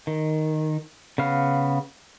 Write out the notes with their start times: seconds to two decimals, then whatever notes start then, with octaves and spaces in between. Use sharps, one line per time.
0.07 D#3
1.18 C#3 B3 F5